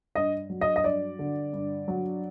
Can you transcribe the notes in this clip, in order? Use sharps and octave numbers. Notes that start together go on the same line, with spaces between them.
G2 D#5
F#3
D#5
D#5
G2 D5
D3
G2
F#3